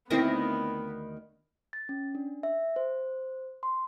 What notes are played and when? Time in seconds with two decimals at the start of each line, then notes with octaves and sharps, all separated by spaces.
0.10 D2 D#3 B3 C4 E4 A#6
1.73 A6
1.89 C#4
2.15 D4
2.43 E5
2.76 C5
3.63 C6